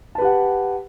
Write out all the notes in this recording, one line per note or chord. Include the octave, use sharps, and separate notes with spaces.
G4 B4 F#5 A5